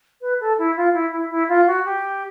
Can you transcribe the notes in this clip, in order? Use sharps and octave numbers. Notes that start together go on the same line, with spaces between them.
B4
A4
E4
F4
E4
E4
E4
F4
F#4
G4